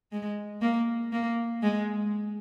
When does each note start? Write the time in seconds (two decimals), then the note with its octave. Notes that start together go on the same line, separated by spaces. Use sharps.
0.12 G#3
0.62 A#3
1.12 A#3
1.62 G#3